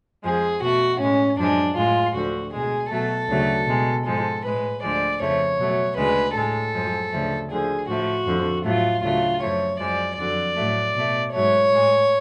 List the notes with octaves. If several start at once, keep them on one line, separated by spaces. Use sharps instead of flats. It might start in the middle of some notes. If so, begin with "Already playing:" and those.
F2 F3 G#3 G#4
B2 A3 F#4
A2 G#3 C#4
F#2 F3 G#3 D4
A2 G#3 F4
D2 D3 F3 F#4
B2 G#3 G#4
B2 F#3 A3 A4
D2 C#3 F#3 A3
B2 G#3
G#2 F3 G#3 A4
A2 G#3 B4
D2 D3 F3 G#3 D5
F2 C#3 F3 A3 C#5
B2 F#3 A3
D2 C#3 G#3 B4
A2 G#3 A4
F#2 F3 G#3
D2 C#3 F3 A3
D2 D3 F3 G#4
A2 F3 A3 F#4
F2 D3 F3
A2 F#3 A3 F4
D2 C#3 F#3 A3 F4
F#2 F3 A3 C#5
F#2 F3 G#3 D5
F2 D3 F#3 D5
A2 F#3 A3
B2 A3
G#2 F#3 A3 C#5
A2 G#3